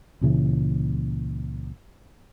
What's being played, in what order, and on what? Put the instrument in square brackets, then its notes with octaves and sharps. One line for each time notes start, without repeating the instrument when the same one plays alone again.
[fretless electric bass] C#2 A#2 C#3 E3